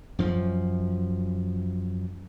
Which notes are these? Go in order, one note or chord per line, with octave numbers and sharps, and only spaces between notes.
F#2 F3